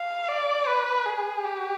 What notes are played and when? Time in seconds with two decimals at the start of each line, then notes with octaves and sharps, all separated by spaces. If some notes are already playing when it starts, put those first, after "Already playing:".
Already playing: F5
0.29 D5
0.68 B4
1.06 G#4
1.45 G4